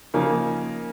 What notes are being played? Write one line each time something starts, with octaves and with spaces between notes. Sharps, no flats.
C#3 F3 A#3 D#4